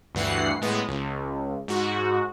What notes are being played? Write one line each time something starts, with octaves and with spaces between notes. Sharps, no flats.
D2 G2 E3 F#5 C7
A2 G#3 B3
C#2
G#2 F#4